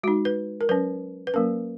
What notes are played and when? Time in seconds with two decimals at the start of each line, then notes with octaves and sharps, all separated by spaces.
0.03 G#3 D#4 F#4
0.25 B4
0.61 A#4
0.69 F#3 C#4 B4
1.27 B4
1.34 F#3 A#3 C#4 A#4